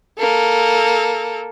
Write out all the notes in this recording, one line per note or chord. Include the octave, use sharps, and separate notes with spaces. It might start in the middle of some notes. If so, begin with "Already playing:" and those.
A#3 A4